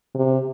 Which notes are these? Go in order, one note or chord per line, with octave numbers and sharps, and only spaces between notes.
C3